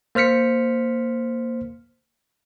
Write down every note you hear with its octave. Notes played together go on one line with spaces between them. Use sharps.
A#3 C5 F6 B6 C#7